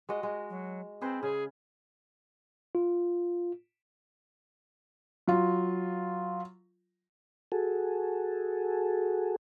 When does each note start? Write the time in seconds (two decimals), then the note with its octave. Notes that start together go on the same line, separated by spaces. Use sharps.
0.09 G#3 F#4 D#5
0.23 G#3
0.50 F#3
1.01 C4 G#4 B4 C5
1.23 C#3 G#4
2.75 F4
5.28 F#3 F4
7.52 F#4 G#4 A4